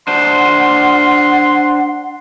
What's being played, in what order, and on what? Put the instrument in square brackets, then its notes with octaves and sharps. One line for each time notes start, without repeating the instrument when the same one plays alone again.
[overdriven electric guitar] D4 C5 [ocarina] F#5 [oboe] C6